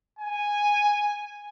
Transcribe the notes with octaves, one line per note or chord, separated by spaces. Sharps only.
G#5